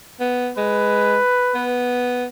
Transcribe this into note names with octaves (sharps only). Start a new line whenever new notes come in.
B3
G#3 B4
B3